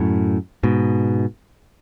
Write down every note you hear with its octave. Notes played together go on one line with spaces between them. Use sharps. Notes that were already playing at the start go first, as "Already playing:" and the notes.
Already playing: F#2 A2
G#2 B2